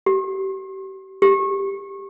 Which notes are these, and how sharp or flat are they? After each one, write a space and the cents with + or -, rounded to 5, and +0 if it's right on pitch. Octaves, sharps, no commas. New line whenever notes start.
G4 -35
G4 +0